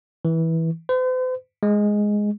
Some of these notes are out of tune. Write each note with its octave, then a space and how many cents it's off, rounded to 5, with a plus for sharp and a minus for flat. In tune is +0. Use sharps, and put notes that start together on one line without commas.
E3 -15
C5 -45
G#3 +0